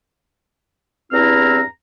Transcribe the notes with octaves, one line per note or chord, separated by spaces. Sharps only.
E2 G2 C4 E4 A#5 F6